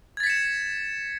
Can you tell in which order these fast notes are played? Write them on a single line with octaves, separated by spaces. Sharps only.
G#6 A6 B6 C#7 E7